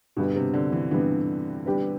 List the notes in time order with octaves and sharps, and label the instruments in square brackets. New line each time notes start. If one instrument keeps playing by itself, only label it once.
[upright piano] G2 D3 G3 B3 [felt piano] B2
[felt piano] C3
D3
E3
[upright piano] G2 D3 G3 B3 [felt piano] E3
[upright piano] G3 B3 D4 G4 B4